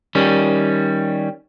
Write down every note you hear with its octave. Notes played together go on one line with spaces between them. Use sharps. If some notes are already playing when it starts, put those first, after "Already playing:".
D#3 G3 C#4